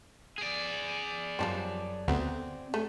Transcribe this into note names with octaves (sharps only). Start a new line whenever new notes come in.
G#4 D5
F#2 F3 G3 C4 A5
D2 B3 C4
A3 C#4